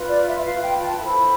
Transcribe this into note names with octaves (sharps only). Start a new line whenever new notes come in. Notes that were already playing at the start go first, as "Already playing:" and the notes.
Already playing: F4 B4
D5
E5
F4 B4 F5
G5
A5
E4 A4 C5 B5